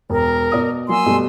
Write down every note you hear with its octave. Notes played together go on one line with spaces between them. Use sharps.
E1 A#4
B2 D5 D#6
F#3 A#3 G#5 C6 E6
B2 G3 A3